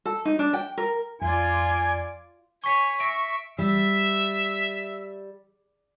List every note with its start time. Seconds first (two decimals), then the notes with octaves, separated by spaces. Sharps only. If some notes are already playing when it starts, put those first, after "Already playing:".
0.06 A4
0.25 D#4
0.39 D4
0.53 G5
0.78 A#4
1.22 F2 F4 D5 G#5
2.64 C#5 G#5 C#6 B6
3.00 E5 C#6 A#6 D7
3.59 G3 E5